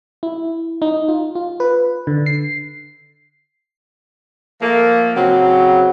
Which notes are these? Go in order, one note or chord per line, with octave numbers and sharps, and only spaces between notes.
E4
D#4
F4
F4
B4
D3
C7
F3 A3 A#3
C#3 F#3 C4